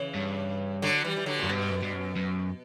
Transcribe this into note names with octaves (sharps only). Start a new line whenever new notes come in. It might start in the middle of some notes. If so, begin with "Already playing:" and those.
Already playing: C#3 E3
G2
D3 F#3
E3 G3
E3
D3 F#3
F#2 A#2
G2 B2
F#2
G2
F#2
F#2